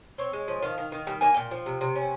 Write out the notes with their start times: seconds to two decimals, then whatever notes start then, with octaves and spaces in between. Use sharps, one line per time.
0.18 C4 C#5
0.33 G#3
0.48 F3
0.62 D#3 F5
0.78 D#3
0.92 D#3
1.07 G3 G5
1.21 A#3 G#5
1.34 A#2 G5
1.51 F3
1.66 C3
1.81 C3
1.96 C#4